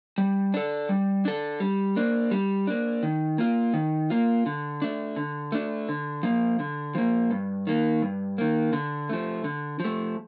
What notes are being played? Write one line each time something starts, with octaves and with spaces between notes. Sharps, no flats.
G3
D4 A4
G3
D4 A4
G3
A#3 D4
G3
A#3 D4
D#3
A#3 F4
D#3
A#3 F4
D3
A3 D4
D3
A3 D4
D3
F3 A#3
D3
F3 A#3
G2
D#3 A#3
G2
D#3 A#3
D3
F3 A3
D3
F3
A3